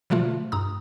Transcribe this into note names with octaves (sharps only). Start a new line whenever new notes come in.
B2 D3 F3 A3 F4
G2 A#5 D#6